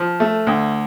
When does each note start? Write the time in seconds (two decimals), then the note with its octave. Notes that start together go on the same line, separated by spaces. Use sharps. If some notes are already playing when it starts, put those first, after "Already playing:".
Already playing: F3
0.20 A3
0.47 D2